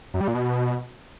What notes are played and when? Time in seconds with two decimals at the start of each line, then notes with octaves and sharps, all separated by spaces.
0.14 F#2
0.21 G3
0.28 A#2
0.35 B2